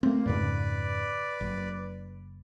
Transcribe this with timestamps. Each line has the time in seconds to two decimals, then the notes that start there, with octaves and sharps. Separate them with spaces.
0.03 A3 A#3 C4
0.26 F2 G#2 C#3 B4 D5
1.41 F#1